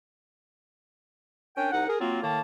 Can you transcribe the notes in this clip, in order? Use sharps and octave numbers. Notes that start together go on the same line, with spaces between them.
C#4 D4 A#4 G5
C2 D#4 F#5
G#4 A#4
F#3 A#3 C4 F4
A2 D#3 A#3 A5